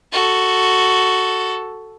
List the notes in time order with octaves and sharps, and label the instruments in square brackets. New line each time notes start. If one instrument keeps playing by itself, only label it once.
[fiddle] F#4 A4